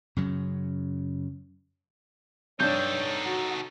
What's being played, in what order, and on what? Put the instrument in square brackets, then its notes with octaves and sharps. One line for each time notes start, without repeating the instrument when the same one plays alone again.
[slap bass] F#2 C#3 F#3
[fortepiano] G2 D4 [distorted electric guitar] D#4 A4 [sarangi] C#5 [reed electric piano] G6
[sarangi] F#4